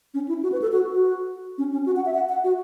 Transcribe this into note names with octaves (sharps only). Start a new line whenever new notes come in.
C#4
E4
F#4
B4
A4
F#4
F#4
C#4
C#4
F#4
F#5
E5
F#5
F#5
F#4